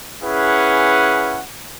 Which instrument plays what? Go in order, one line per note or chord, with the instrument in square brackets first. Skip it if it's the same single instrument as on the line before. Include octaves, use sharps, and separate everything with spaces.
[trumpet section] C#4 E4 G#4 B4 F#5